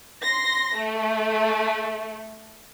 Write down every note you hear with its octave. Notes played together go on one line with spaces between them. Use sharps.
C6 A#6
A3